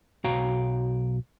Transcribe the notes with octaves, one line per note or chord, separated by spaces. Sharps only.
B1 F#4 C#5 F5 G5 A#5